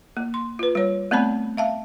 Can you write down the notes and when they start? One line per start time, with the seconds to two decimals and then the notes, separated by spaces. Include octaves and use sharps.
0.17 A#3
0.34 C6
0.59 F4 B4
0.75 G3 C#5
1.11 A3 B3 C4 D5 A5 B5
1.57 E5 F5 A5